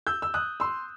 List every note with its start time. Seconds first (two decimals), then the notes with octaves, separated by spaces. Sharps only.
0.07 E6 G6
0.22 E6
0.34 D#6 F#6
0.60 C6 E6